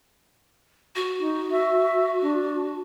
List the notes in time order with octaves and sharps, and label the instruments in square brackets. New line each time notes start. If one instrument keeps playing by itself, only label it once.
[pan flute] F#4
[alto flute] D#4
E5
D4